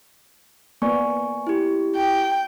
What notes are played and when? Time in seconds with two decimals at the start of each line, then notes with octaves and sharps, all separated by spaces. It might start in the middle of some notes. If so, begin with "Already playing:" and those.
0.82 A#3 B3 D5 G#5 C#6
1.47 E4 G4
1.96 G5